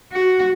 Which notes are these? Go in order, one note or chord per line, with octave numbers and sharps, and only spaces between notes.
F#4